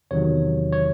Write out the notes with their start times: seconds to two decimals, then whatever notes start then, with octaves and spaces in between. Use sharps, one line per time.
0.11 E2 C3 D#3 F#3 C#5
0.72 C#5